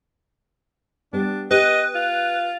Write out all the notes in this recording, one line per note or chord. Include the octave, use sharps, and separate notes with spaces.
G3 B3 D4
G4 B4 D#5
F4